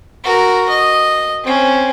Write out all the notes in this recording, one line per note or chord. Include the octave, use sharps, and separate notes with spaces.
F#4 A#4
D#5
C4 C#4